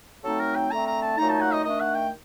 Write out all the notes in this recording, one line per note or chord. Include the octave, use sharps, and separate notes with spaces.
F#3 A3 C4 D#4 A4
A#4
G5
D3 A3 C4 A#5
A#5
A5
A#2 F#3 A3 D#4 A#5
A5
F#5
D#5
D#3 A3 D4 D#5
F#5
G5